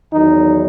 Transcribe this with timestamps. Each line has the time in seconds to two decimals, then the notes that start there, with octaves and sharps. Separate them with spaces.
0.12 E2 D#3 F#3 D#4